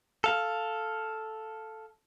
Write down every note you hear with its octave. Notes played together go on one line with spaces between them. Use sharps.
A4 F5